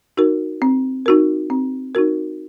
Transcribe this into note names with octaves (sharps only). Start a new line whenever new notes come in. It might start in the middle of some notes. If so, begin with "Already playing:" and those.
D#4 F#4 A#4
C4
D#4 F#4 A#4
C4
D#4 F#4 A#4